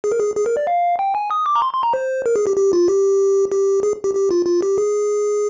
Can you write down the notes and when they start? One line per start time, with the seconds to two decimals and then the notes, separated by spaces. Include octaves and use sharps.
0.04 G#4
0.12 A#4
0.20 G#4
0.36 G#4
0.46 A#4
0.57 D5
0.67 F5
0.99 G5
1.15 G#5
1.31 D#6
1.46 D6
1.55 A#5
1.62 C6
1.73 C6
1.83 A#5
1.94 C5
2.26 A#4
2.36 G#4
2.47 G4
2.57 G4
2.73 F4
2.88 G4
3.52 G4
3.83 G#4
4.04 G4
4.15 G4
4.31 F4
4.46 F4
4.62 G4
4.78 G#4